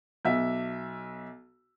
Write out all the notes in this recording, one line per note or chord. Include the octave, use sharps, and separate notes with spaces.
B1 E5